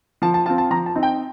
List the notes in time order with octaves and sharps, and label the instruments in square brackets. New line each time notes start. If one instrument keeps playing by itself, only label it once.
[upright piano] F3 A5
A5
C4 F4 A5
A5
F3 A#5
A5
C4 D#4
G5